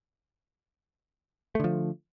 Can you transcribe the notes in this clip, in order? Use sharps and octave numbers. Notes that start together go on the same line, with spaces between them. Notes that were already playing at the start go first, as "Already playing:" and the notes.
D3 F3 A3